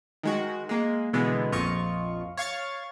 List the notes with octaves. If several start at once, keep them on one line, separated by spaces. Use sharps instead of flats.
D#3 G#3 F#4
G#3 A#3
B2 D3 E3 G#3 B3
A#1 F2 F4 D#5 C#6
C#5 F5 C#6 A6